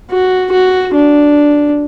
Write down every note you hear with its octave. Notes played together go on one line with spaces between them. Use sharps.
F#4
F#4
D4